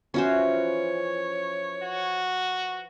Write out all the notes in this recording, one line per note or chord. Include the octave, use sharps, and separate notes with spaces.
E3 F3 C#4 F#4 C5 C#5
F#4